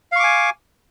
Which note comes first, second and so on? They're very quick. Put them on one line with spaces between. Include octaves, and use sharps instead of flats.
F5 C#6 D6 G#5